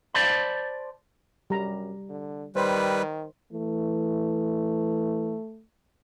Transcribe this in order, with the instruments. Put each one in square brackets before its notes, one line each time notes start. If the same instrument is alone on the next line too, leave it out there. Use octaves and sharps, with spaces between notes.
[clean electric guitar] C5 D5 A5 B5
[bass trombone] F#2 [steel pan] G3 A#5
[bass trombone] D3
[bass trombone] D#3 [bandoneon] G3 B4 [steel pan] C5
[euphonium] E3 [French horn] A3